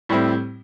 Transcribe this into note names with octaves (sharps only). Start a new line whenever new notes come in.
A2 G3 C4 E4